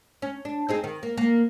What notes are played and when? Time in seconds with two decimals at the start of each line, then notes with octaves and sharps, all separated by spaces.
0.22 C#4
0.45 D4
0.69 C4 D#4 G#4
0.84 D#3
1.03 A#3
1.17 A#3